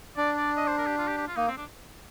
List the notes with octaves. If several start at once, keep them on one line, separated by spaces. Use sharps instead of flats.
D4 D5
D5
D#5
C5
A#4
G4
F4
G4
G4
F4
A#3 D#4
C4
D4